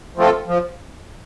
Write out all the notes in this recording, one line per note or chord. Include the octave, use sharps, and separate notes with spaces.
F3 A3 C4 F4 A4
F3